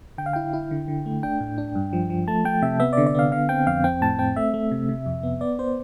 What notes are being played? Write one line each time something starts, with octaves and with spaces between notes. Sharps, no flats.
D3 G5
F5
E4 G5
E4
D3
D3
A3
D4 G5
A2
D4
G2
F3
F3
A3 A5
A3 G5
C3 E5
B3 E5
D3 D5
D5
B3 F5
D3 F5
C4 G5
F2 F5
C4 G5
A2 A5
C4 G5
A3 E5
A3
C3
C3
F2
B3
B3 D5
B3 C5